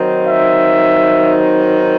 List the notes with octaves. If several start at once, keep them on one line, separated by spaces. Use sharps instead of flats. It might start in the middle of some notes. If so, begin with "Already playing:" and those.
Already playing: D#3 F#3 C4 D#4
E5